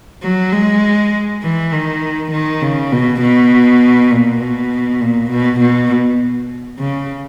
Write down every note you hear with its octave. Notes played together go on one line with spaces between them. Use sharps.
F#3
G#3
E3
D#3
D#3
C#3
B2
B2
A#2
B2
A#2
B2
B2
C#3